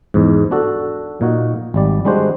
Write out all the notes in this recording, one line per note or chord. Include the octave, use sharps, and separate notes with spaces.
E2 G#2
D4 F#4 A4
A#2 D#4 F#4
G#1 G3 D5
G3 G#3 D4 F#4 C5